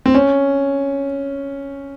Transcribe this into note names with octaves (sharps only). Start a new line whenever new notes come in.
C4
C#4